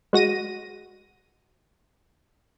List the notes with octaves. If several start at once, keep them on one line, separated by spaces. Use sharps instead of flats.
G#3 F#4 A#6 D#7